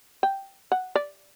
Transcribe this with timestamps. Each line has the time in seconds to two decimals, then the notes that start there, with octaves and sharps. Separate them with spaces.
0.23 G5
0.72 F#5
0.95 D5